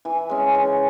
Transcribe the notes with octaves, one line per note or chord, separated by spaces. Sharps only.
E3
G#3 C#4
E3